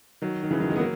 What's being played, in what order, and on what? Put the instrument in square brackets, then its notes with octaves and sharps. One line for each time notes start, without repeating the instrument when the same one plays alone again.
[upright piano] D#3 F#3
D#3
C#3 E3
D#3 F#3
E3 G#3
B3
F#3 A#3